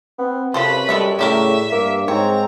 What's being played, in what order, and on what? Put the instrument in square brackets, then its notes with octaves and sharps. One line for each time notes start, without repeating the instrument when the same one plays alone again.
[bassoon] B3 [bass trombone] C4
[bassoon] F#2 [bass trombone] C3 [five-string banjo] F4 A4 C5 [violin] B4 B5
[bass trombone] G3 [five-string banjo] G#3 A4 E5
[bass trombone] A2 [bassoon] C#3 [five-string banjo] D4 G4 A#4 [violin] E5
[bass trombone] G2 [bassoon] A#3
[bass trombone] G#2 [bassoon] C4 [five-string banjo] C#5 [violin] A#5